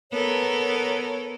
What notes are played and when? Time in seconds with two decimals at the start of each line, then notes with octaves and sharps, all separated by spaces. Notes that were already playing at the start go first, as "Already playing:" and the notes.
0.12 B3 A4 A#4 C#5